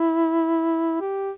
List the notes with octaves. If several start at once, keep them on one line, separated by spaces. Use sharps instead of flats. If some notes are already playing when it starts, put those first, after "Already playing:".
Already playing: E4
G4